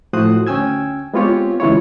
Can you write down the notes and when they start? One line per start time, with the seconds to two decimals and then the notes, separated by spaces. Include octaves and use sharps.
0.13 A2 F3 F#4 C5 D#6 F#6
0.47 D2 C#4 G5 G#5 E6 G#6
1.14 G#3 B3 C4 F4 G4 C#5
1.60 C#3 E3 G#3 E4 F4 C#5